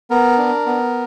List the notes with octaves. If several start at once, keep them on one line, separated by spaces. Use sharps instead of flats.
B3 A#4
D4
B3